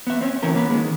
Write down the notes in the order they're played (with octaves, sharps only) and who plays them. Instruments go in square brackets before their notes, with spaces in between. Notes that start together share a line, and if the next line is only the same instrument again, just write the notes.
[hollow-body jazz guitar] B3 E5
C4 C#4
D2 D3 E3 C#4 A#4
A#3 B4
D#3 G#3